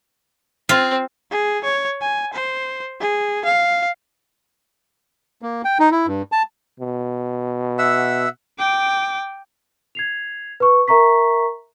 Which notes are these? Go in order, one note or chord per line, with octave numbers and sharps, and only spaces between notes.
C4 F4
G#4
C#5
G#5
C5
G#4
F5
A#3
G5
D#4
E4
G2
A5
B2
E5 F#5 E6
G5 D6
G#6 C7 F7
B4 C#6
A#4 E5 A#5 C#6 B6